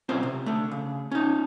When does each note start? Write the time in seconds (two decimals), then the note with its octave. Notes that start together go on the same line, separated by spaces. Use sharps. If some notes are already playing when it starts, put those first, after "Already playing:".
0.09 B1 C4 C#4 F4 C5
0.23 C3
0.46 D3 A3
0.71 C#3
1.11 C#4 D#4